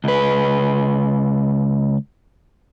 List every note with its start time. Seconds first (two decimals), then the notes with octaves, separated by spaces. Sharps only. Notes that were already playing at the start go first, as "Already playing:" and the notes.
0.04 C#2 B4